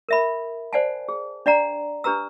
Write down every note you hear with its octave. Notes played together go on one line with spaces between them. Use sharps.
A#4 E5 B5
C5 D5 F#5 G#5 A5
G#4
D4 D5 F#5 A#5
D4 G4 B4 A#5 E6